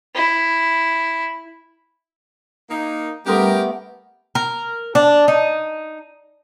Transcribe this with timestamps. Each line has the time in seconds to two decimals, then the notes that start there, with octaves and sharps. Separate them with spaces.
0.15 E4
2.70 A#3 D#4
3.27 G3 A3 B3 C#4 G4 A4 A#4 C6
4.35 A#4
4.95 D4
5.28 D#4